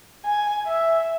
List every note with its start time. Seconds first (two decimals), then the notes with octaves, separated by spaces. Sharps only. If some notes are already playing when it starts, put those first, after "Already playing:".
0.25 G#5
0.66 E5